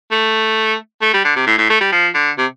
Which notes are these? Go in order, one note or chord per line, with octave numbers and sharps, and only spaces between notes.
A3
A3
G3
D3
C3
A2
A2
A3
G3
F3
D3
C3